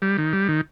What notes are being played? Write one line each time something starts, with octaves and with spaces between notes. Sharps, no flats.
G3
D#3
G3
D#3